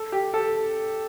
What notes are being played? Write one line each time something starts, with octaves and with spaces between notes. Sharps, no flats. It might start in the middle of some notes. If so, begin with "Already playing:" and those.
Already playing: A4
G4
A4